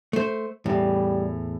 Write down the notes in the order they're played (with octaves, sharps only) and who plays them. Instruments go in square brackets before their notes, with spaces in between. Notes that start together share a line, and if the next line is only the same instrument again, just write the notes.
[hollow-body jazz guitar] A3 C5
[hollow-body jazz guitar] E2 A2 [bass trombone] G3